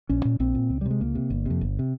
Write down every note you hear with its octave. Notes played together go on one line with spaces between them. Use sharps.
A#1 C#4
A#2
A#1 C4
A#2
C#2
G3
C3
G#3
C#2 A#3
C3
G1
F2 C3
G1
C3